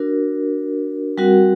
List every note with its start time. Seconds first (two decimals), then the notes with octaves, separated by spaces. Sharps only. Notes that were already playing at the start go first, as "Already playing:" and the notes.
Already playing: D4 F#4 A#4
1.18 G3 C4 F#4 A#4 F#5